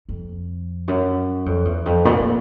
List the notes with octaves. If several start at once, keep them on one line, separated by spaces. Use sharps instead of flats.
F2
F#2
F2
E2
F2
A#2
A#2